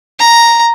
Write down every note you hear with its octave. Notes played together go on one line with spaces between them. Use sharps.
A#5